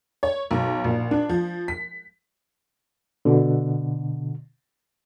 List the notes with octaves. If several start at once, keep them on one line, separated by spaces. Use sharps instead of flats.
C#5
B1
A#1
D4
F3
B6
B2 D3